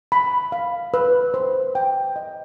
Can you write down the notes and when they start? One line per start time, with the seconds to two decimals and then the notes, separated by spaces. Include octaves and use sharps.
0.12 B5
0.52 F5
0.94 B4
1.34 C5
1.75 G5
2.16 D#5